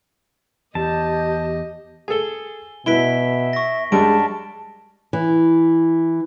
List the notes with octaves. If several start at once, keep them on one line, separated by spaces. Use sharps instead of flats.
E2 G4 D#5 A5
G#4 A4 G#5 G7
B2 E4 B4 E5 B6 D7 G7
C#6 A#6
F#2 G3 G#3 D4 A5 D7
E3